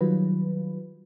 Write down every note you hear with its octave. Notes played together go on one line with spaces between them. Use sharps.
D#3 F#3 G3 F4 B4